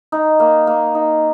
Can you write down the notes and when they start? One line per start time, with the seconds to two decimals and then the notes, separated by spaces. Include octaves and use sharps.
0.12 D#4
0.40 A#3
0.67 A#3
0.95 D#4